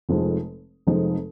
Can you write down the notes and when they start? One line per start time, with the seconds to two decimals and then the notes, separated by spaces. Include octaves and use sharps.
0.09 F1 F2 F3 G#3 D#4
0.87 F1 F2 F3 G#3 D#4